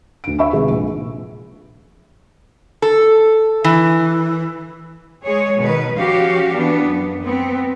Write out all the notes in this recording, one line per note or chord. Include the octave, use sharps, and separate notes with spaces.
D2 D7
E5 F5 B5 C#6 E6
C3 D#3 G#3 G#4 B4
A#1
A4
E3
G#3 G#4 C#5
B2 D#3 B4
F3 C#4 F#4 G4 F5
E3 B3 D4
F#2
B3 C4